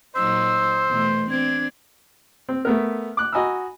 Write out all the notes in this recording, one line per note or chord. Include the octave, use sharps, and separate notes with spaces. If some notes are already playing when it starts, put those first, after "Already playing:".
A#2 F#3 D#4 C5 E6
E2 B2 A3
C4 D4 G#6
C4
A3 B3 A#4
D6 F#6
F#4 D#5 G#5 A#5 B5 E6